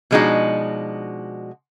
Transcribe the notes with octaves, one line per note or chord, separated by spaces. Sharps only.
B2 F3 G#3 D4 D#4 F#4